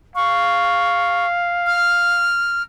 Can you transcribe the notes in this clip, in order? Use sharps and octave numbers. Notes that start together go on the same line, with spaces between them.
F5 C#6
F6